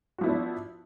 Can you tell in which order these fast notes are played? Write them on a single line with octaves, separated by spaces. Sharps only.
F#4 F3 E4 B3 D4